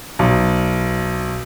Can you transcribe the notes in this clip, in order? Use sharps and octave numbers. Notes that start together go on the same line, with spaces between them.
B1